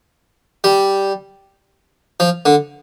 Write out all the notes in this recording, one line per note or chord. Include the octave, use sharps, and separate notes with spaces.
G3
F3
D3